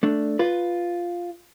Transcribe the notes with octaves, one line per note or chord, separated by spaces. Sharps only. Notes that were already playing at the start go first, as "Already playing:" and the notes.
A3 D4
F4 B4